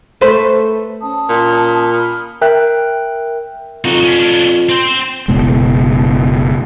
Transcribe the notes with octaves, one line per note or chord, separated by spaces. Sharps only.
A3 B4 C5
C#4 A5 D#6
A#2
B5 D#6 F6
A#4 E5 G5 F#6
F2 D#4 F#4
C#4 D4
C4 C5
F#1 B2 G#3